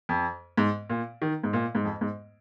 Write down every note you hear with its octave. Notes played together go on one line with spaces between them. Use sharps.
F2
G#2
A#2
D#3
G#2
A#2
G#2
F2
G#2